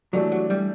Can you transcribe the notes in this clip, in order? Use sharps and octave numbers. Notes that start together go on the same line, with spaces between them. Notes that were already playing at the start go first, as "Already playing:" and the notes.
E3 F#3 A3 D4 G4
F#3
G3